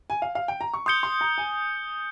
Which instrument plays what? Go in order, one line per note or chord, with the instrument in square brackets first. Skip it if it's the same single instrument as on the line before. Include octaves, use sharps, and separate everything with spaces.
[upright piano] G#5
F5
F5
G5
A#5
C#6
[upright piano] C6 [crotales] D#6 G6 C#7 G7
[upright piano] C6
A#5
G#5